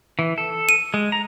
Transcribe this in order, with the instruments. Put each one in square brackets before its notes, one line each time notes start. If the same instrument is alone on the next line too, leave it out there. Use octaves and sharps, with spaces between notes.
[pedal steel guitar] E3
A4
[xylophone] D#7
[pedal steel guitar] G#3
A#5